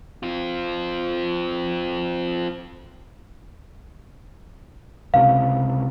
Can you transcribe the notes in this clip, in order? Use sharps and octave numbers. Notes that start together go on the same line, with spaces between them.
C4 F4
C#2 C3 F5